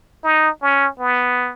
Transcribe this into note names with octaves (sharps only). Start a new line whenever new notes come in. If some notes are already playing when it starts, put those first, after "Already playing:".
D#4
C#4
B3